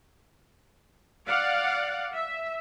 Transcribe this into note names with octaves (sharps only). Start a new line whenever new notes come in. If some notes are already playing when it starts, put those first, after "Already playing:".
D5 F5 F#5
E5